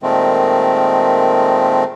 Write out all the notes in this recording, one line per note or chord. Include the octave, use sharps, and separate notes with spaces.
A#2 D#3 G#3 A3 C4